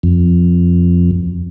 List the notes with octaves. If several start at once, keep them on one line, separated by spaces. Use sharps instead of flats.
F2